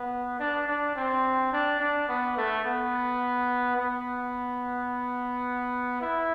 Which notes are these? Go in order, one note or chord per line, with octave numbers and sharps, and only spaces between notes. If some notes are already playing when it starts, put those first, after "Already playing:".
Already playing: B3
D4
D4
C4
D4
D4
B3
A3
B3
B3
E4